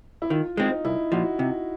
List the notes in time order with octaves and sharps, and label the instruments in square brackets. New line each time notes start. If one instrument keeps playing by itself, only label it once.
[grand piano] E4
[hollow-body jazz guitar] D#3 [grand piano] F4
[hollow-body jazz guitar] G#3 C4 [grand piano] D#4
[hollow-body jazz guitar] C2 [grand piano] E4
[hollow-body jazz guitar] A#2 F3 [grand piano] F#4
[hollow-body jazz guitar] C3